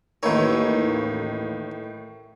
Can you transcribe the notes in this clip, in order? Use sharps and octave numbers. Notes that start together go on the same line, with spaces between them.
A1 D#2 A2 D#3 E3 C#5